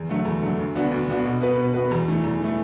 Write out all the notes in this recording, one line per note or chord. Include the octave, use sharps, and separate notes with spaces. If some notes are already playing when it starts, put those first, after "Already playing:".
Already playing: E2
D3 F#3 A3
E2
D3 F#3 A3
D2
D3 B3 D4 F#4
D2
D3 B3 D4 F#4
B2
B3 F#4 B4
B2
B3 F#4 B4
E2
E3 A3
E2
E3 A3